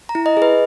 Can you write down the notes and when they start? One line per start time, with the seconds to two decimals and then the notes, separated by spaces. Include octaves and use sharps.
0.09 A#5
0.15 E4
0.26 D#5
0.37 G#4
0.42 B4